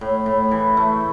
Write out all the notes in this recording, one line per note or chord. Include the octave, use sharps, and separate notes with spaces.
A2
A2
E3
A3